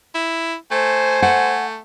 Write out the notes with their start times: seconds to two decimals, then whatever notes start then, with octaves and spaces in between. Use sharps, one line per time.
0.15 E4
0.71 A3 C5 G#5
1.22 A3 F#5